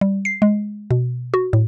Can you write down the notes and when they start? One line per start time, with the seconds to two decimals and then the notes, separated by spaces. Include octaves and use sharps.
0.01 G3
0.25 C7
0.42 G#3
0.91 B2
1.34 F#4
1.53 A2